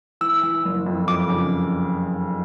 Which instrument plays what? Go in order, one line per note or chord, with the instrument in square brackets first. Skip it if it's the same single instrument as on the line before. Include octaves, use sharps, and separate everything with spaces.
[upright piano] E3 [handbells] E6
[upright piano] E3
F#1
F2
[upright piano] F2 [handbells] D6
[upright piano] C#3